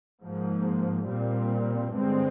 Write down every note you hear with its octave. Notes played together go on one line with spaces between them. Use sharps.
G#2 F3 A#3
A#2 G3 C4
G2 D3 G#3 C4